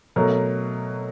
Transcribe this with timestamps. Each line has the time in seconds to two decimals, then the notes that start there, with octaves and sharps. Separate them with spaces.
0.16 B2 F#3 A3 A#4